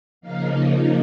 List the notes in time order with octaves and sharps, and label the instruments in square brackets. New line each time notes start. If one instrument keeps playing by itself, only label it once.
[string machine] C#3 F3 A#3 D#4 F5